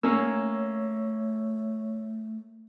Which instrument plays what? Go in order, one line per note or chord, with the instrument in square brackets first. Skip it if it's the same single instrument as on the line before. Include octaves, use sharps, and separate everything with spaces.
[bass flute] A3 [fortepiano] A#3 C#4 [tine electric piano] C#5 E6